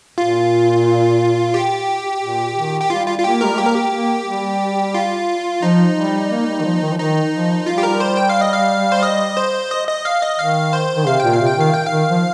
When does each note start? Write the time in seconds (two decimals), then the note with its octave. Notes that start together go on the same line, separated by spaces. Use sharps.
0.18 A#2 F4
1.54 G4
2.22 A#2
2.56 D#3
2.81 G4
2.90 G3 F4
3.07 F4
3.19 F4
3.24 A#3 G4
3.41 G3 A#4
3.58 A#3 G4
3.66 A#4
3.74 G4
3.93 A#3
4.26 G3
4.94 F4
5.62 F3 D#4
5.97 G3
6.31 A#3
6.47 G3
6.60 D#3
6.64 F3
6.82 D#3
6.92 F3
6.98 D#3 D#4
7.33 F3
7.66 G3 F4
7.78 G4
7.83 A#4
8.00 C5
8.17 G5
8.29 F5
8.41 D#5
8.53 F5
8.92 C5
9.03 D#5
9.37 C5
9.71 D#5
9.88 D#5
10.05 F5
10.22 D#5
10.39 D#3 F5
10.73 C5
10.96 D#3
11.07 C3 F5
11.20 A#2 G5
11.33 F5
11.41 C3
11.47 G5
11.58 D#3 F5
11.74 G5
11.86 F5
11.92 D#3
12.10 F3